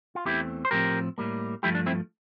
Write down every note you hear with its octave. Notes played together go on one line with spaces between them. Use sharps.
F4
E2 E3 A3 C4 E4 G4
C5
A2 F3 C4 G4 A#4
A2 G3 A#3
G2 F3 A3 E4 G4
D4
C4 E4